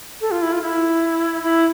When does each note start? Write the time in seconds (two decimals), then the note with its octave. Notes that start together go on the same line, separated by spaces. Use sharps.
0.21 A4
0.31 F4
0.42 E4
0.52 F4
0.62 E4
1.43 E4